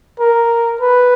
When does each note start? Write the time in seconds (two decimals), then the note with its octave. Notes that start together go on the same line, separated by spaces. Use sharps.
0.20 A#4
0.81 B4